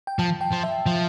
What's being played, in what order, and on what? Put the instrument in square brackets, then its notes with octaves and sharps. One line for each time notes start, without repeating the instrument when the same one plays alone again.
[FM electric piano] G5
[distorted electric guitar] F3 [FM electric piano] A5
[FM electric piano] G5
[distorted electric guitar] F3
[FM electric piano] E5
[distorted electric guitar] F3